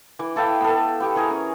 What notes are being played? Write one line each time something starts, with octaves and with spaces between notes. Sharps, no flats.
E3 D6
E4 A4 F5 G5
B3 A4
B3 G4 C#6
E3 G#4 A#4
C#4